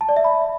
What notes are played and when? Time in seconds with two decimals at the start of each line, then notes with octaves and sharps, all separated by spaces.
0.01 A5
0.09 D5
0.17 E5
0.24 B5